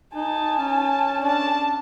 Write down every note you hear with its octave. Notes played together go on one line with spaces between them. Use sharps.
D#4 G#5 A5
C#4
D4 A5